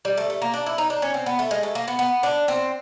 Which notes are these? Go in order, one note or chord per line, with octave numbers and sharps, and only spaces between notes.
G3
A3
A3
A#3
D4
E4
D#4
D4
C#4
C4
B3
A3
G#3
A3
A#3
B3
B3
D4
C4